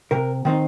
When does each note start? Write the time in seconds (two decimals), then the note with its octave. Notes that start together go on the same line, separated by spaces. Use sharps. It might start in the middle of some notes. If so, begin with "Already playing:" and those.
0.11 C3 A#4
0.45 D#3 C4 D#4